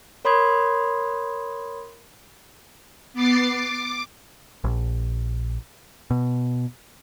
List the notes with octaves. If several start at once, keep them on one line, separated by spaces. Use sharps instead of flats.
A#4 C#5 B5 C6 D#6 G#6
B3 D6 A6 C7
D6
A#1
B2